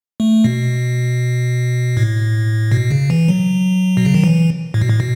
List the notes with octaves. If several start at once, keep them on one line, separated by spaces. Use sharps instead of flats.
A3
B2
A2
B2
C#3
E3
F#3
B2
C#3
D#3
E3
A2
B2
A2
B2